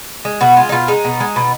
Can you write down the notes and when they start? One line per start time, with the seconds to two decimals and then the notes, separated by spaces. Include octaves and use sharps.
0.25 G#3
0.41 B2 F#4
0.57 G#3 F4
0.69 D#4
0.72 B2 F4
0.88 G#3 D#4
1.05 B2
1.20 G#3
1.36 B2